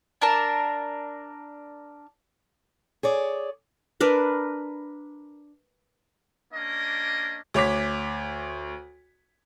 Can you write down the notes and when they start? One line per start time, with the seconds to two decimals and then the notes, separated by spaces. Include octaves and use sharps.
0.22 D4 A#4 A5
3.03 G#4 C#5 D5
4.00 D4 A#4 B4
6.53 A#3 C#4 D4 D#5
7.54 D2 C#5 D6 B6